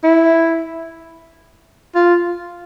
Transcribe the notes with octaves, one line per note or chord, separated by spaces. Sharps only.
E4
F4